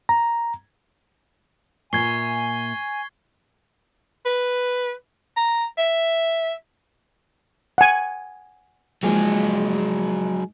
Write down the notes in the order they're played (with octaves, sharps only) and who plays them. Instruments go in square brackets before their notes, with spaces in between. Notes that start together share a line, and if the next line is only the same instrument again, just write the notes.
[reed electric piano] A#5
[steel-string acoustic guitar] A#2 E5 [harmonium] G#5 [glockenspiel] C#6 C7 [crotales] G#6 G7
[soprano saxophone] B4
A#5
E5
[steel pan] F#5 G#5
[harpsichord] A#1 G#2 F4 [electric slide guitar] F#3 G#4